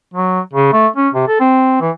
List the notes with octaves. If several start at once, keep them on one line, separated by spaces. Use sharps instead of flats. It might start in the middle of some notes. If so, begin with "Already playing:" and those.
F#3
C#3
A3
C#4
C3
A4
C4
E3